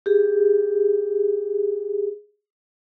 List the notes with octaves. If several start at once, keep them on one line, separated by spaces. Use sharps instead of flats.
G4 G#4